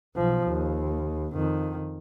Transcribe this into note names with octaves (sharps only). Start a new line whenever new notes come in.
B1 F3
D#2
F2 D#3